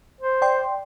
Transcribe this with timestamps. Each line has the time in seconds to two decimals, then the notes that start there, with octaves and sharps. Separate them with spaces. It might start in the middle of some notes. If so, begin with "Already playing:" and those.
0.20 C5
0.42 D5 G5 C6